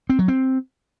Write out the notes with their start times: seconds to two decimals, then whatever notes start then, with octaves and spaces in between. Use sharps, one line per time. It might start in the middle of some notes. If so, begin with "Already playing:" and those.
0.10 C4
0.19 F#3
0.28 C4